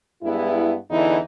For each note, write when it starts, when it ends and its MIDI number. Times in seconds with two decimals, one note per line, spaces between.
0.23 0.75 43
0.23 0.75 56
0.23 0.75 59
0.23 0.75 64
0.91 1.19 40
0.91 1.19 50
0.91 1.19 52
0.91 1.19 63
0.91 1.19 64